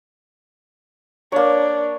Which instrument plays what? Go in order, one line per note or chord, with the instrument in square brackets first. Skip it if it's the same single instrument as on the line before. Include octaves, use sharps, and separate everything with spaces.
[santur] A#3 C#5 [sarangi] D4